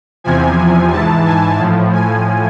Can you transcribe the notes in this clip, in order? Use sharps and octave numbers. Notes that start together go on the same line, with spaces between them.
E2 C3 F3 G#5
G#2 E3 A5
G#5
A2 F3
G#5